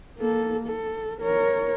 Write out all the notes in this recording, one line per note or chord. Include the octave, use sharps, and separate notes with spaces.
A#3 A4
A4
A#4 C#5